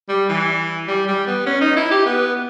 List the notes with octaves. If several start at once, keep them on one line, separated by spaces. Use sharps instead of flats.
G3
E3
G3
G3
B3
C#4
D#4
E4
G4
B3